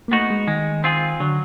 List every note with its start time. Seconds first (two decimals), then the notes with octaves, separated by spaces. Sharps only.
0.08 A#3
0.11 A3 B3 D#4 F#4
0.30 G#3
0.47 D#3 G#3
0.84 C4 F4 G#4
1.20 D3 F#3